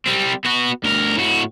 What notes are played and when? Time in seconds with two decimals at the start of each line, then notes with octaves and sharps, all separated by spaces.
0.06 G3 C4
0.45 B3 F#4
0.84 D2 A#4
1.17 A2 F#4